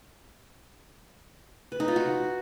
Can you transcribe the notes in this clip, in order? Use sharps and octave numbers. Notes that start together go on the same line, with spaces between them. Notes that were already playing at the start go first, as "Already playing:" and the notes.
B4
D#4
F4
F#4